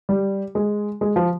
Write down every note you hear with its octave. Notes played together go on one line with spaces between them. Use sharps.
G3
G#3
G#3
F3